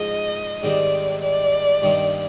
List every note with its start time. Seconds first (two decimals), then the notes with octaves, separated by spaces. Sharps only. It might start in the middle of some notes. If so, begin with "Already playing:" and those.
Already playing: G#2 F3 G#3 D#5
0.63 G#2 D#3 G3 C4 D5
1.22 D5
1.82 G2 D#3 A#3